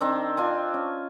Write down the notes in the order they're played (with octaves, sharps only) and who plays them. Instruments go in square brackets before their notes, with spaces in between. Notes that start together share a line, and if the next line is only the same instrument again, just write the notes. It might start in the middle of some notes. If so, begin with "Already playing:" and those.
[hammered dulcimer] D#3 C4 D4
D4 F4 G#5
C#4